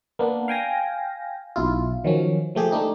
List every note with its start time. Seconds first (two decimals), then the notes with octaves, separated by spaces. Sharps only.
0.19 A#3 B3 D4
0.48 F5 G5 G#5 A#6
1.56 B1 E4 F4
2.04 D#3 F3 F#3 C#4
2.55 F3 A3 G4 G#4
2.71 A3 D4 D#4 G4